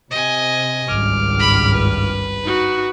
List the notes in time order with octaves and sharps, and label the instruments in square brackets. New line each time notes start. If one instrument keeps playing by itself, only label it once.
[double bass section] C3 [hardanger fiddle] D#5 G#5
[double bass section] G#1 C#2 G2 [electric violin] D6 F6
[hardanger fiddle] B5
B4
[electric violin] D#4 F#4